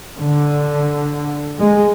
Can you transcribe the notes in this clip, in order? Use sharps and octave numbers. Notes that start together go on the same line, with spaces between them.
D3
G#3